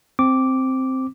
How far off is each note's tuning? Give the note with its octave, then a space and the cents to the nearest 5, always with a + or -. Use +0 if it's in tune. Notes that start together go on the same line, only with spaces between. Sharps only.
C4 +0 D6 -5